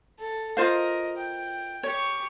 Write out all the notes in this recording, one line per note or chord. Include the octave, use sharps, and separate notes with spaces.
A4
F4 A#4 C5 D#5 F5
G5
G4 C#5 C#6